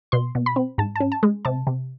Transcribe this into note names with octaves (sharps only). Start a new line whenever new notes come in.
B2 C6
B2
B5
C4
G#2 A5
C#4 A5
A5
G#3
C3 A5
C3